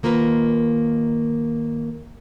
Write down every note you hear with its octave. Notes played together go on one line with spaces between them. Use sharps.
D#3 A#3 F4 A#4 B4